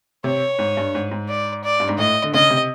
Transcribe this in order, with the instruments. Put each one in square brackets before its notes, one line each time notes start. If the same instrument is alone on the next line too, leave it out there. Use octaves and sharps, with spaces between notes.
[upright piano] C3 [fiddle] C#5
[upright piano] G#2
G2
G#2
G#2
[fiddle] D5
D5
[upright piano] G2
G#2
[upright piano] A2 [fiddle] D#5
[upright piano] D3
[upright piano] C#3 [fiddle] D#5
[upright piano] C3